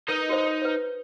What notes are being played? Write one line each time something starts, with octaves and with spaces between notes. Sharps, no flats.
D#4 A#4 B4 D#5
F#4 A#4 C5
B4 C5